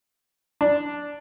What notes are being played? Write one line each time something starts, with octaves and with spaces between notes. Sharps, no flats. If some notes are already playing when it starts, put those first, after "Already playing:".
D4